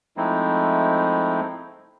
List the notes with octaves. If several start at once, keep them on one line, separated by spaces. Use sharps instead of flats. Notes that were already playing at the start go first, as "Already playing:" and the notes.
F3 G#3 A3 C4 D#4 E4